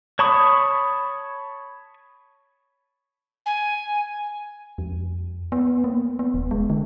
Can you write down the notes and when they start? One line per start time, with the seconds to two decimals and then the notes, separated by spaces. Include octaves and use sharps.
0.19 C#5 A5 B5 C#6 D#6
3.46 G#5
4.78 F2
5.52 B3
5.84 A#3
6.19 B3
6.34 D#1
6.51 G#3
6.70 D3